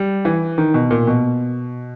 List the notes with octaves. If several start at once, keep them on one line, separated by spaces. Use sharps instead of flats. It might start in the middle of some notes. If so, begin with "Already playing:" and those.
Already playing: G3
E3
D#3
B2
A#2
B2